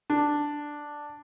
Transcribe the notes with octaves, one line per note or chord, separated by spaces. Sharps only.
D4